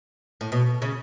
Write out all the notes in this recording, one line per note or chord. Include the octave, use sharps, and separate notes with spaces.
A2
B2
C#3